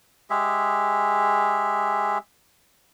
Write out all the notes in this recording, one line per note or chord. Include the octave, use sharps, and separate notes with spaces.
G#3 G4 G#4 E5